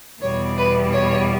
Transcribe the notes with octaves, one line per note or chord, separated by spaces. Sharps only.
E2 B2 G3 C#5
B4
C#5